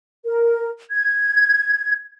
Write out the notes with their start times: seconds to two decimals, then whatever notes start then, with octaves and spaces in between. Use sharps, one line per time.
0.25 A#4
0.90 G#6